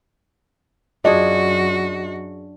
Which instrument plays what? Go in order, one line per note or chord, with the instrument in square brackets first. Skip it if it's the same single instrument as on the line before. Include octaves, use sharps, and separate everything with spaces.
[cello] F#2 F#4 [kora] D4 F4 G#4 [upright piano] D#5